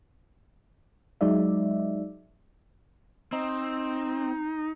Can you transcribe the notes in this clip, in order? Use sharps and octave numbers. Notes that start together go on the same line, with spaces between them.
F#3 G#3 D#4 D5 E5
C4 D#4